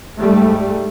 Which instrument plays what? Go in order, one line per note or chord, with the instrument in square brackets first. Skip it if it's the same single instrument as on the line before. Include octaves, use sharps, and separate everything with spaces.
[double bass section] G#2 G3 A3